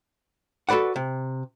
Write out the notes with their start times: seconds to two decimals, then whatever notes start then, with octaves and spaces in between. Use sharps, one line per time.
0.69 F#4 A4 B4 D5 F#5
0.96 C3